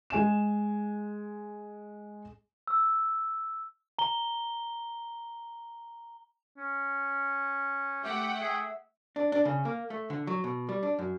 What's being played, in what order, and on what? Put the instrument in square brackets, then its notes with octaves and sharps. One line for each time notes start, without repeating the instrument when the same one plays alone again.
[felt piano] G#3 G#5 E7
[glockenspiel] E6
A#5 G7
[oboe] C#4
[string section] A3 F#5 G5 [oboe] G4 [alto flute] E5
[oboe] G#4 [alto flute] E5
[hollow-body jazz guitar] D4
D4
C#3
A#3
A3
D3
F#3
B2
G3
D4
F#2